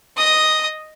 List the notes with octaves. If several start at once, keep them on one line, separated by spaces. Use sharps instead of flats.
D#5 D#6